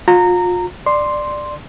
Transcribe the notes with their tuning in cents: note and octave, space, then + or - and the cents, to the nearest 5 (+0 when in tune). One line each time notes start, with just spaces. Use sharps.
F4 +35 A#5 -20
D5 +15 C6 +0